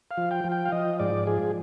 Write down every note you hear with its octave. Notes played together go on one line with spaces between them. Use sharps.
F5
F3
G5
F3
G5
F5
F3 D#5
G#2 D5
F3 G#4